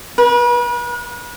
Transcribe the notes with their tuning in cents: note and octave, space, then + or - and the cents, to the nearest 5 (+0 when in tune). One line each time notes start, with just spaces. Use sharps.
B4 -40